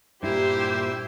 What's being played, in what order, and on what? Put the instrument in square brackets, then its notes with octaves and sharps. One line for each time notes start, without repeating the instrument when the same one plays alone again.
[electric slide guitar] G2 A#2 [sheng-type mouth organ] E4 [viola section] G4 [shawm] C5